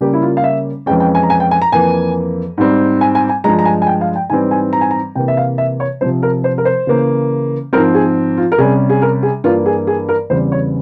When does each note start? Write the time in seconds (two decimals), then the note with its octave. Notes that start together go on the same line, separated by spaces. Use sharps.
0.01 C#3 G3 A#3 C#4 G4
0.13 E4
0.22 F4
0.37 F5
0.44 E5
0.86 F2 E3 G#3 C#4 G5
1.00 G5
1.15 G#5
1.23 A#5
1.30 G#5
1.40 G5
1.51 G#5
1.62 A#5
1.72 F2 E3 A#3 G#5
2.58 G#2 G3 C4
3.01 G#5
3.15 G#5
3.29 G#5
3.44 G2 F3 G#3 A#5
3.59 A#5
3.65 G#5
3.82 G#5
3.87 G5
4.01 F5
4.15 G5
4.30 G#2 E3 G3 C4 G#5
4.51 G#5
4.73 A#5
4.81 G#5
4.91 A#5
5.15 C3 E3 A#3 G5
5.28 E5
5.37 F5
5.58 E5
5.80 C#5
6.01 C3 F3 C4 C5
6.23 A#4
6.44 C5
6.58 A#4
6.65 C5
6.87 C#3 E3 A#3
7.73 G#2 F3 C4 A#4
7.94 G#4
8.37 F4
8.52 A#4
8.58 C3 G3 C#4 G#4
8.90 G#4
9.02 A#4
9.23 G#4
9.44 G2 E3 A#3 F4
9.66 G#4
9.87 G#4
10.09 A#4
10.30 E2 C#3 E3 G3 C4 C5
10.52 C#5